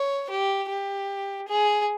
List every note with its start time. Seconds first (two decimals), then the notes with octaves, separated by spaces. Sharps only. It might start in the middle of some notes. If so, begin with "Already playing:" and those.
Already playing: C#5
0.30 G4
0.69 G4
1.48 G#4